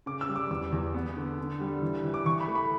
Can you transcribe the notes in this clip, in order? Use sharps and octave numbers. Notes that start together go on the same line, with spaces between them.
C#3 D6
E6
G3
D6
E2 D6
E2
B3
D3
D3
G3
E3
E3
D6
E3 C#6
B5
A3
B5